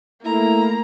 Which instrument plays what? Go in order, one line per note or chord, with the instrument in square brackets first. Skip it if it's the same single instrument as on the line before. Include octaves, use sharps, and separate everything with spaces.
[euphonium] A3 [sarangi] A#3 [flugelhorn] E4 [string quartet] A#5